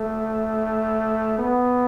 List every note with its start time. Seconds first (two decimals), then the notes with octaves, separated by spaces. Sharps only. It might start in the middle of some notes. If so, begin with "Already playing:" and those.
Already playing: A3
1.39 B3